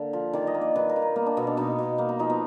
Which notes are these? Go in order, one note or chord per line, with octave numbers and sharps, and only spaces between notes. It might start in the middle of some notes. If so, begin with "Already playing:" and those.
Already playing: D3 A#3 A#4
F3
D#3 D5
D#5
A#3
D5
D#3 B4
A#4
D#3
A#4
A#3 B3
D4
B2 B3
D4
B2 D#4
B2
A#3 D#4
D#4
F3 D#4
B3